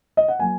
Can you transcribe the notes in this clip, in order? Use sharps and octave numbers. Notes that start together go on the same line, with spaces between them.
D#5
F#5
F#3 A#3 G#5